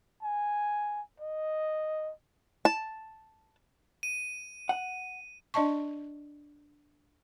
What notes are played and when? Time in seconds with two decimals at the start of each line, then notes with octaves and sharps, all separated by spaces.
0.23 G#5
1.20 D#5
2.65 A5
4.03 D#7
4.69 F#5
5.54 D4 D5 D#5 A5 C#6